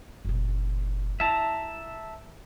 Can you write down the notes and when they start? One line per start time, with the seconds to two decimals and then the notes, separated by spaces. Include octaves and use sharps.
0.25 F#1 A#2
1.20 E4 E5 A5 A#5